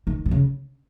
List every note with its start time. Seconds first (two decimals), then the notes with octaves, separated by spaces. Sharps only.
0.07 D#3
0.26 B2
0.31 C#3